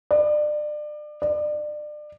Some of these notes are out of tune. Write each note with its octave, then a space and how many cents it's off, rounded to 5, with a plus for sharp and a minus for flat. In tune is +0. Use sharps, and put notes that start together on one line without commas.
D5 +30
D5 +30